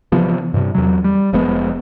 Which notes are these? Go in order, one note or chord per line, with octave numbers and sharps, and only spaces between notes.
C3 E3 F3 B3
G2 C3
E2 F#3
G3
F1 F3 G#3 B3